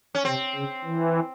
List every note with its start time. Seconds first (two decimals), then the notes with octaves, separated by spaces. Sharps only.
0.15 C#4
0.25 C3 C4
0.55 C#3
0.84 E3